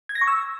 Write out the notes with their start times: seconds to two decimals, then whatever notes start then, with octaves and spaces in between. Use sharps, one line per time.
0.09 G#6
0.15 A#6
0.21 C#6
0.27 E6